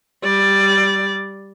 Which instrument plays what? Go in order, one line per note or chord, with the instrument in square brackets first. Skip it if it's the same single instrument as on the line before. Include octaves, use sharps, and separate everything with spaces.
[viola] G3 D5